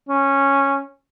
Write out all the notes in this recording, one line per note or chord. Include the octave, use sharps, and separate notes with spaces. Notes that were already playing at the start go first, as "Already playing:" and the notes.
C#4